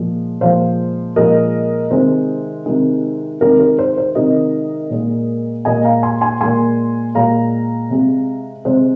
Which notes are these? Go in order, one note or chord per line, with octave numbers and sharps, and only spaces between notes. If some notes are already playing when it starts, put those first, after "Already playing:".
Already playing: A#2 F3 G#3
A#2 F3 G#3 C5 F5
A#2 F3 G#3 A#4 D#5
C3 D#3 G#3 C5
C3 D#3 G#3
C3 D#3 G#3 A#4
A#4
C5
C5
C3 D#3 G#3 A#4 D#5
A#2 G#3
A#2 G#3 D#5 G#5
F5 A#5
G#5 C6
G#5 C6
A#2 G#3 G#5 C6
A#2 G#3 F5 A#5
C3 G#3
C3 G#3 C5